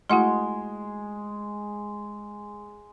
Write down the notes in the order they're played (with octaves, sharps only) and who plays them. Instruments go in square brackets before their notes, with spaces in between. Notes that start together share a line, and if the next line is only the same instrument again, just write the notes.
[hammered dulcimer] G#3 [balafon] A3 E4 F#4 [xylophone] F#5 C6